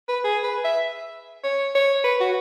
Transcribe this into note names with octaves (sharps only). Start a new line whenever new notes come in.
B4
G#4
B4
E5
C#5
C#5
B4
F#4